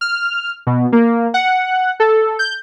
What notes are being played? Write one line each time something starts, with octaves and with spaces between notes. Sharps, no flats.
F6
B2
A#3
F#5
A4
G6